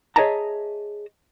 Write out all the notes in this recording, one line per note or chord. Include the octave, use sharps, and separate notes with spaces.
G#4 C#5 D#5 E5 A5 A#5